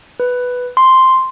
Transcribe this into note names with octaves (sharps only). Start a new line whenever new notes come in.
B4
C6